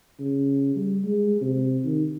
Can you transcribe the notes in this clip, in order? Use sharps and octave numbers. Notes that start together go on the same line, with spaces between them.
C#3
G3
G#3
C3
D#3